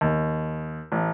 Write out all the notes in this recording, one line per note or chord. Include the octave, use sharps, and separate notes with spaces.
D#2
A1